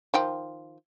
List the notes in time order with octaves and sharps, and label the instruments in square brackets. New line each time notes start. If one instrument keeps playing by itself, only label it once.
[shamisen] D#3 F3 G5